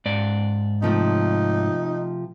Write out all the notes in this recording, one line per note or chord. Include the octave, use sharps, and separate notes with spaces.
G#2 D5
C3 F3 A3 D#4